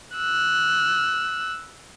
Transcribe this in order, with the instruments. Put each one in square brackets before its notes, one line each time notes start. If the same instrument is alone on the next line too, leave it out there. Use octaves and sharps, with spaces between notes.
[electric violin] E6 F#6